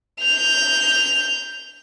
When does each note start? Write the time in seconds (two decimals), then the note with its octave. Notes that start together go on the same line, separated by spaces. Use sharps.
0.21 G6 F7